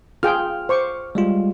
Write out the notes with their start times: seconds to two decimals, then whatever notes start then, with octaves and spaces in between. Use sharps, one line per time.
0.23 F4 G#4 G5 F6
0.69 C5 C#6 D6
1.15 G3 G#3 F4